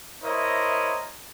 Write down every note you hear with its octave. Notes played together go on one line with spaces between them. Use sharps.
E4 A#4 C5 C#5 D#5 E5